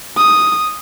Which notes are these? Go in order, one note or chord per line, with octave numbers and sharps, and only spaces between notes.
D#6